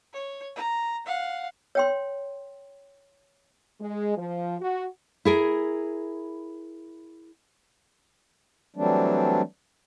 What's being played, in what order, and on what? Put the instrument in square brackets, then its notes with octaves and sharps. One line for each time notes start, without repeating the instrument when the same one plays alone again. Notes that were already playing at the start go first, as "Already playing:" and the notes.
[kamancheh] C#5
A#5
F5 F#5
[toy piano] C#5 G5 C6
[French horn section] G#3
F3
F#4
[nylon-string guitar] E4 G#4 A#4
[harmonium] E3 F#3 G3 A3 C4 D4